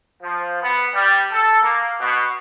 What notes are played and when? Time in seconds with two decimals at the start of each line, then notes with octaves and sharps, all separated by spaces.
0.22 F3
0.61 B3
0.93 G3
1.31 A4
1.61 A#3
2.00 B2